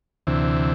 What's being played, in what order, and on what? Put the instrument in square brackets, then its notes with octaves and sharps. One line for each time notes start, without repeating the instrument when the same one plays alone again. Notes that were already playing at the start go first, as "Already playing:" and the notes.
[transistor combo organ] D2 C3 E3